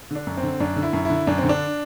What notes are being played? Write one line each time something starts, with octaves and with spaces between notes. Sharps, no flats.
D3 D4
F#2
C4
D3
F#2 D4
D3
E4
F#2
D3 E4
F#2 D4
D3 C4
D4